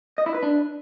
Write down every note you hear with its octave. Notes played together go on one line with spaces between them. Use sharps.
D#5
E4
B4
D4